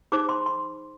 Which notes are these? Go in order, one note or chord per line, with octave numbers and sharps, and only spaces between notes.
D#4 G#4 C5 D6
C6
C6